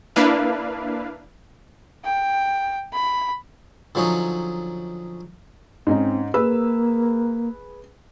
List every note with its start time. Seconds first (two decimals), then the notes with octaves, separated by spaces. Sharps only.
0.16 A#3 D4 E4 B4 F5
2.04 G5
2.93 B5
3.95 D3 F3 F#3 C#4 D#4
5.87 G#2 C4 C#4 D#4
6.34 A#3 G#4 B4 E6